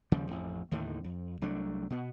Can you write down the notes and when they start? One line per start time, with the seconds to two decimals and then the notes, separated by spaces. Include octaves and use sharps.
0.12 D#2 C#3 F3 G3
0.31 A1 F2
0.71 D#2 A2 D3 D#3
1.04 F2
1.41 C2 F#3 A3 D4
1.90 B2 B3